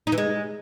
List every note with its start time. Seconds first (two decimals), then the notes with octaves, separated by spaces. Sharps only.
0.07 D#4
0.12 E3
0.18 G#3